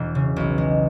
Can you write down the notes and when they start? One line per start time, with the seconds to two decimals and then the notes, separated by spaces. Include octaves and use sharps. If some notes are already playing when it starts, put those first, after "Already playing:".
Already playing: E1
0.15 C#3
0.36 B1
0.58 G#3